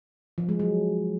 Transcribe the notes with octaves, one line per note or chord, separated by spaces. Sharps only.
F3
G#3
F#3